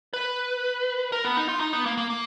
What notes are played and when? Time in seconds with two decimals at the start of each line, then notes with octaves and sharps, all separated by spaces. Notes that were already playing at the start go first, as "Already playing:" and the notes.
0.14 B4
1.12 A#4
1.24 B3
1.37 D#4
1.49 F4
1.61 D#4
1.73 B3
1.86 A#3
1.98 A#3
2.10 A#3